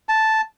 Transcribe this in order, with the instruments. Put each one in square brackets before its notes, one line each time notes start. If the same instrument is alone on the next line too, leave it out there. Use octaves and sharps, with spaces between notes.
[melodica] A5